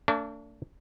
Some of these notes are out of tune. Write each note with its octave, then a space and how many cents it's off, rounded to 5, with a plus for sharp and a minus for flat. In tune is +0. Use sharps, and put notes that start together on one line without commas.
A3 +45 D4 -25